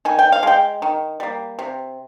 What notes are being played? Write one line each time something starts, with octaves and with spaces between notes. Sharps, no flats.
D#3 G#5
G5
F5
G#3 G5
D#3
G3 A#3
C3